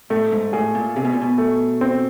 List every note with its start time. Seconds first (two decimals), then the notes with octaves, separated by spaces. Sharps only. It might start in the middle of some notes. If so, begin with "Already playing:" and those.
0.10 A2 A3
0.32 G#2
0.53 A2 G#4
0.75 A#2
0.96 C3 G#4
1.05 B2
1.13 A#2
1.22 B2
1.38 A3
1.81 C4